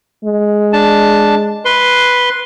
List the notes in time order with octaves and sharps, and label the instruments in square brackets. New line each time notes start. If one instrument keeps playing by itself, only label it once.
[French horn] G#3
[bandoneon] D4 A5
B4 C6